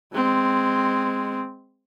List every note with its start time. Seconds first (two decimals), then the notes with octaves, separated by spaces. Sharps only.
0.14 G#3 C4